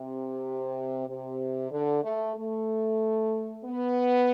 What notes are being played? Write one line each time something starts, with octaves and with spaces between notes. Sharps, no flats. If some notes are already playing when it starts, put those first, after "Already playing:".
Already playing: C3
C3
D3
A3
A3
B3